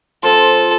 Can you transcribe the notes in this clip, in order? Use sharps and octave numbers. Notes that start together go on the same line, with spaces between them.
F3 C4 F4 A4 C5